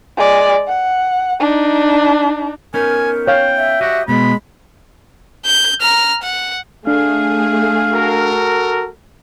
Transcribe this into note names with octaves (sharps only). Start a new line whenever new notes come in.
G#3 D5
F#5
D4 D#4
B3 C#4 D#4 A#4 G#5
C#5 F5 G5
E5
F#4 G4 D5 D#5
B2 G#3 B3 B5
G6
A#5 F6
F#5
A3 D4 G#4 F5
F#4 A4 A#4